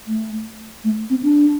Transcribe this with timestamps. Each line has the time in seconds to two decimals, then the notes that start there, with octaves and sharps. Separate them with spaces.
0.07 A3
0.84 A3
1.10 C4
1.23 D4